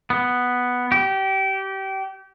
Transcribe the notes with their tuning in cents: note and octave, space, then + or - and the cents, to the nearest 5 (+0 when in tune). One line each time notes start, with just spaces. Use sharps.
B3 +0
G4 -25